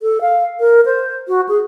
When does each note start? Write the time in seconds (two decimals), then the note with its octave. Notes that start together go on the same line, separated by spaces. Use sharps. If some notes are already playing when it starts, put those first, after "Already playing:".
0.02 A4
0.21 F5
0.60 A#4
0.85 C5
1.28 F#4
1.49 G#4